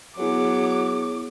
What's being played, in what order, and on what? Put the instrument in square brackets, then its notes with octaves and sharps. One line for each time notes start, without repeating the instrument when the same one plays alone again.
[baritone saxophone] F#3 [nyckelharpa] B3 [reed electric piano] E4 G#4 C#5 [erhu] D6